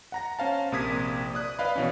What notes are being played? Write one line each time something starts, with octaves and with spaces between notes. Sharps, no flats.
F#5 A#5 A#6
C#4 C5 F5 A5
A#1 C3 A#3 D#6 G#6 B6
D5 D#6 F#6
B4 D5 D#5 F5 B5
B2 E3 C#4